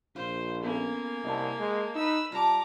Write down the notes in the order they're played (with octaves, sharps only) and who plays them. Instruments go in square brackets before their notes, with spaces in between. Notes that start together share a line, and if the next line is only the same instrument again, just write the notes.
[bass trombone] A#1 [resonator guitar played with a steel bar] F4 [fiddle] C5
[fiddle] A#3 G#5 [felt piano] B3 C#4 A4
[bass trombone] C2 [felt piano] D#5 A5
[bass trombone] G#3
[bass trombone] D#4 [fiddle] B4 E6
[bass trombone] G3 [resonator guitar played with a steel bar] F4 A5 [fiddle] A#5 D6